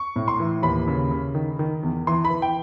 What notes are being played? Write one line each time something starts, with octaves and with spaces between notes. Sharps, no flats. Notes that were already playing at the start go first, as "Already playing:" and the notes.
Already playing: C#6
A2
C6
E3
D#2 B5
C#3
C#3
D#3
D#3
E2
E3 C6
B5
E3
G5